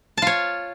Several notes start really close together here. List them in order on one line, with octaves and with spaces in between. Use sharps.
A5 F4 C#5